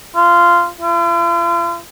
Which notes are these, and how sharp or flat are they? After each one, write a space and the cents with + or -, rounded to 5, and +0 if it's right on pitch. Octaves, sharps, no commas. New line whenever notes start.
F4 -15
F4 -45